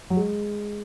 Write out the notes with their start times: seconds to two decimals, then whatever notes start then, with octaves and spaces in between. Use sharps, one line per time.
0.10 F#3
0.17 G#3